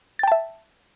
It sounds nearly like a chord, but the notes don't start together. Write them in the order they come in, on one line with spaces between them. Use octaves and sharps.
A6 G5 A5 E5